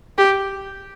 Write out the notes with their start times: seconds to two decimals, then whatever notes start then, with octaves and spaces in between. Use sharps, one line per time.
0.18 G4